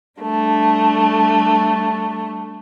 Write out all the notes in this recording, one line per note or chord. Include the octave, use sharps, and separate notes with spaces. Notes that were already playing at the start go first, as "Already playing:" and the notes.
G3 A3 D4